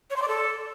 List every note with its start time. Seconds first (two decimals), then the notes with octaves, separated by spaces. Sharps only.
0.10 C#5
0.16 C6
0.22 D5
0.28 A4